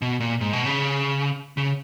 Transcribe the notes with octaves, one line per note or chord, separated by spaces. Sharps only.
B2
A#2
G#2
B2
C#3
C#3